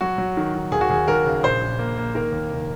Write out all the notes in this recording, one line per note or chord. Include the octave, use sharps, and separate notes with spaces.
F#3 F#4
F#3
D#3
D#3
D#2 G#4
F#4
D#2 G#4
D#2 A#4
C#3
A#1 C5
A#1
A#3
A#3
D#3 A#4
D#2
F1